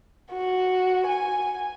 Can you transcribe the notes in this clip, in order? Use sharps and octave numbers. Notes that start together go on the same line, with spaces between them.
F#4
G#5